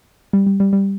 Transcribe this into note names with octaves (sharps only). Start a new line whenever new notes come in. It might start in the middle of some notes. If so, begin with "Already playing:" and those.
G3
G3
G3
G3